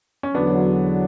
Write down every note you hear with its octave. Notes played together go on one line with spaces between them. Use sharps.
C#4
E2 D3 F#3 B3 D4